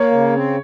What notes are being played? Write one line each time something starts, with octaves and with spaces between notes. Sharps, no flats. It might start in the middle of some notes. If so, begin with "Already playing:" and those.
Already playing: A#3 C#5
C#3
C4